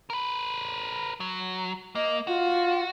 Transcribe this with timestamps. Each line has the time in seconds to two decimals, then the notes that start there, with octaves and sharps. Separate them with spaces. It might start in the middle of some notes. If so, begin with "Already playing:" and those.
0.10 A#4 B4
1.20 F#3
1.95 A#3 D#5
2.27 F4 F#4